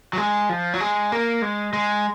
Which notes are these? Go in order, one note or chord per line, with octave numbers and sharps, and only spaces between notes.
F#3
G#3
F3
F#3
G#3
A#3
G#3
G#3